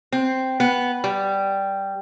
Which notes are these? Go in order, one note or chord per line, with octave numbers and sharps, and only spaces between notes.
C4
B3
G3